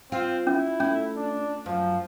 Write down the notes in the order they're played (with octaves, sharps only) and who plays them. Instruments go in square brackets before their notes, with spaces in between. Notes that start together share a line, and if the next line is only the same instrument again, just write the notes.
[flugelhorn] C4 [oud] F4
[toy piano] C#4 [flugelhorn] E4
[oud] A3 [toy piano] C#4
[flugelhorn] D4
[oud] F#2 [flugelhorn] F3